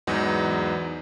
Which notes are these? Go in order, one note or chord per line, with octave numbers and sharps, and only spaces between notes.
E2 G#2 F#3 B3 D#4